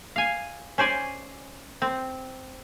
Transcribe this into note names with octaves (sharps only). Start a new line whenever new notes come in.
F5 G#5
C#4 C5 D5 G#5
C4